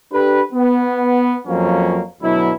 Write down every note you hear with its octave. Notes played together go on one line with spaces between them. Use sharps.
D4 G4 A4 B4
B3
F2 F3 F#3 A#3 C#4
D2 B2 F#3 E4